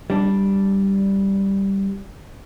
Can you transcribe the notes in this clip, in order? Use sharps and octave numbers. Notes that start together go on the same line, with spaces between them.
G3 D4